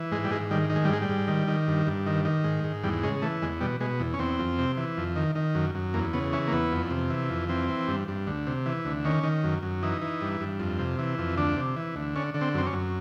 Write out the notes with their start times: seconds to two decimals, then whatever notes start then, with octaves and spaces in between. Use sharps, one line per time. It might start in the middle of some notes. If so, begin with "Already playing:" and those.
Already playing: E3
0.12 G#2 G#3
0.24 G3
0.31 G#2 G#3
0.51 D#3 G3
0.70 D#3
0.76 G#3
0.85 G3
0.89 G#2 G#3
1.02 G3
1.09 G#2
1.28 D#3
1.48 D#3
1.68 G2
1.87 G2
2.06 D#3
2.25 D#3
2.44 G#2
2.64 G#2
2.83 E2 G3
3.03 C#3 G#3
3.22 E3 A3
3.42 E2 G#3
3.61 B2 G3
3.80 B2 G#3
4.00 E2
4.14 C#4
4.19 E2 C4
4.39 F2
4.58 C3
4.77 E3
4.97 F2
5.16 D#3
5.35 D#3
5.55 F#2
5.75 F#2
5.94 E2 A#3
6.13 C#3 B3
6.33 E3 C#4
6.48 A#3
6.52 E2 B3
6.72 F2
6.90 C3
7.10 E3
7.30 F2
7.49 E3 C4
7.69 E3
7.88 G2
8.08 G2
8.27 D2
8.47 C3
8.66 E3
8.85 D2
9.05 D#3 C#4
9.23 D#3
9.44 F#2
9.63 F#2
9.83 E3 D#4
10.02 E3
10.21 G2
10.41 G2
10.60 F2
10.79 C3
10.99 E3
11.18 F2
11.37 D2 D4
11.56 C3
11.76 E3
11.96 D2
12.16 D3 C#4
12.34 D3
12.41 C4
12.54 F#2 C4
12.66 C#4
12.73 F#2